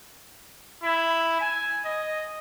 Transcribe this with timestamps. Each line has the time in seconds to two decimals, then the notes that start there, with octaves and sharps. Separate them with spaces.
0.84 E4
1.40 G#5
1.85 D#5